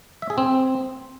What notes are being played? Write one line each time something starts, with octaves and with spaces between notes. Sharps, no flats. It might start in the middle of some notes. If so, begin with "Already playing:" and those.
E5
G#4
C4